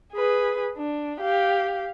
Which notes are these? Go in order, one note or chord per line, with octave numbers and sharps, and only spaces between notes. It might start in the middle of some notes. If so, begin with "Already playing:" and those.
G#4 B4
D4
G4 F5